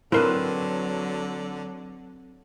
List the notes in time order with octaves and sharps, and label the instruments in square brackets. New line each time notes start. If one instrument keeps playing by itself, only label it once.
[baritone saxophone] D3 [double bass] F#3 [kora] C4 B4 [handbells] E4 A#4